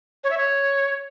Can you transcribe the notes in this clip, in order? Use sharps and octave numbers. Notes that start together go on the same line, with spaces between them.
C#5
E5
C#5